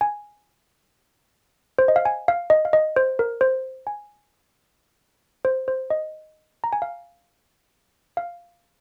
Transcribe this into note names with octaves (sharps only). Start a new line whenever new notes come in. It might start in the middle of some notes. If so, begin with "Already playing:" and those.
G#5
C5
D#5
F5
G#5
F5
D#5
F5
D#5
C5
A#4
C5
G#5
C5
C5
D#5
A#5
G#5
F5
F5